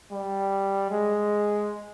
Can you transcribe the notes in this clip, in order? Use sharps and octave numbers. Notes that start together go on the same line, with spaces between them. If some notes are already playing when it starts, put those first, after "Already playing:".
G3
G#3